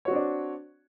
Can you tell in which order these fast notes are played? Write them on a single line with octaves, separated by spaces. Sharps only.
C#5 F#4 C4 D4 D5